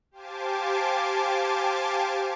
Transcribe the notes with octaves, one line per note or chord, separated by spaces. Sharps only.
G4 C5 F5 G#5 A5 D6